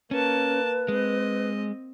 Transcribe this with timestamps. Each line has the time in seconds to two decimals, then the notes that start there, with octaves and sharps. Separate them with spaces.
0.11 A#3 C#4 B4 A5
0.88 G#3 C4 D#5